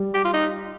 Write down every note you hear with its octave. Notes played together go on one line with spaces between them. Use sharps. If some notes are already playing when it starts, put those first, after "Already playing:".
Already playing: G3
G4
F4
D#4